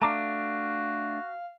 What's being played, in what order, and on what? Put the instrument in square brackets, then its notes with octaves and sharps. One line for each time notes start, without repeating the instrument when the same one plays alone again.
[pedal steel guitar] A3 D4 [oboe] F#4 [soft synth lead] F5 [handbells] A5 A#5 D6